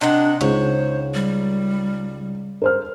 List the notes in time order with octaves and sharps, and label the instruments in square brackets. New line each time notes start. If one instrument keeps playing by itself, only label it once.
[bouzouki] C3 D#4 F#5 [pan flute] D4
[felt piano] C#2 D#4 [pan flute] C5 [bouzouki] C#5
[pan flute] G3
[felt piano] A#4 C5 F6